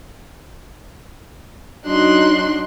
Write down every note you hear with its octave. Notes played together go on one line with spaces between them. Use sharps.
F#3 D4 D#4 F#4 C6 F#6